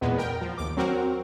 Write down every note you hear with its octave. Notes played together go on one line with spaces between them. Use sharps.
E2 A#2 G#3 B3
A#4 G5
F3
D#2 D6
F#3 C4 F#4 A#4